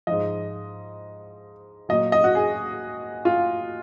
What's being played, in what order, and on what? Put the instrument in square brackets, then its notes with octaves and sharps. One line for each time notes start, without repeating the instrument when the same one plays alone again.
[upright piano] G#2 F3 D#5
A#2 F#3 D#5
D#5
F#4
G#4
F4